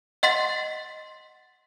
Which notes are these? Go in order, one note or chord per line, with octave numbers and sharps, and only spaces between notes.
D#5 F#5 C6 A6 B6